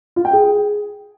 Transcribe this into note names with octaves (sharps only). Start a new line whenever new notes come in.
F4
G5
G#4